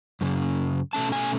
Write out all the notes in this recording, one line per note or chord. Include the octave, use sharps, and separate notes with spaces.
F#2 C#3
B2 A3 C#4 A5
G#5